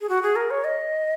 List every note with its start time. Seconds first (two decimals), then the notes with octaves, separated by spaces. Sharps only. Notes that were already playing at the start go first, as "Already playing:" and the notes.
0.01 G#4
0.09 F#4
0.23 G#4
0.36 A#4
0.51 C#5
0.64 D#5